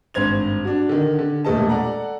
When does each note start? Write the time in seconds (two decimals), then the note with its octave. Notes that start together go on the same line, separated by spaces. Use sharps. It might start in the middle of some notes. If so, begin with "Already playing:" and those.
0.14 G#1 G2 C5 G#6 F7
0.64 D4 F#4
0.89 D3 D#3
1.19 D3
1.45 E1 A#2 A3 A4 D#5 A5
1.69 A4 D5 F#5 A#5